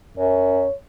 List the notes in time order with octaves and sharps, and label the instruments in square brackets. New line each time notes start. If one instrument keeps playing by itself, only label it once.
[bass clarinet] F#2 [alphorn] C#5